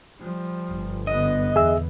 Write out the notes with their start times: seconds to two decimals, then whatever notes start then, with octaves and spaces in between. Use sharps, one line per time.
0.20 F3 G3
0.70 G1
1.07 D3 B3 D#5
1.56 E2 G#4 E5 E6